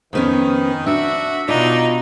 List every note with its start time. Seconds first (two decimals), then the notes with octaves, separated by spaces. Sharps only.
0.13 F2 D#3 B3 C#4
0.86 D4 F#4 E5
1.49 B2 D4 D#4 F4